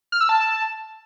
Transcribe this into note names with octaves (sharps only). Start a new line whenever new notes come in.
F6
E6
A5